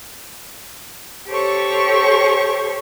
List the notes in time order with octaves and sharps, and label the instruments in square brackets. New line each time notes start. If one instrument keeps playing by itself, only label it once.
[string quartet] G4 A4 C5 C#5 C#6